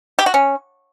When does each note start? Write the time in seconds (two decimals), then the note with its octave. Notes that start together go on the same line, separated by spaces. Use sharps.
0.19 G4
0.26 F#4
0.34 C#4